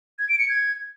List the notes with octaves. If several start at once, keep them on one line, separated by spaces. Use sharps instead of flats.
G#6
D7
C#7
G#6